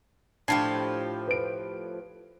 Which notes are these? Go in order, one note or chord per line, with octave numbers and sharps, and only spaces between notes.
A2 F3 D4 G4 A5 C7
B4 D7